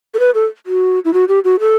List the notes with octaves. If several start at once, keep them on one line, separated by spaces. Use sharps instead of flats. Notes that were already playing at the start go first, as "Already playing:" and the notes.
A4
B4
A4
F#4
E4
F#4
G4
F#4
A4